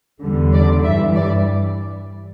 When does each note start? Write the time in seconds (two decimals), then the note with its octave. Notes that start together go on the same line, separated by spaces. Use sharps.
0.22 E2 D3 G3
0.54 D5
0.84 G2 E3 G3 E5
1.15 D5